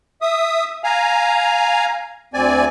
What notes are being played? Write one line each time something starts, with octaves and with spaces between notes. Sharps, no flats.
E5 D#6
F5 G#5 A#5
D2 C4 D5 G#5